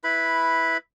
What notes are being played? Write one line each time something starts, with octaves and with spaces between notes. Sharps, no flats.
E4 B4 B5